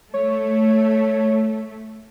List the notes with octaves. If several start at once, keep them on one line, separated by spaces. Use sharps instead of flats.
A3 C#5